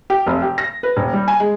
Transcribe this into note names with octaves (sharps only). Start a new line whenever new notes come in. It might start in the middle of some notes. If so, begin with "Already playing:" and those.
G4
F1
G4
A#6
B4
D#1
G3
G#5
G#3